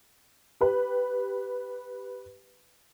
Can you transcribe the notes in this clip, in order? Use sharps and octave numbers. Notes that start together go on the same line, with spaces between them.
G4 B4